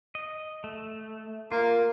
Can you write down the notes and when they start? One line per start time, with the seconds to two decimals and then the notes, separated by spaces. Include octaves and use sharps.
0.15 D#5
0.64 A3
1.52 A#3 F4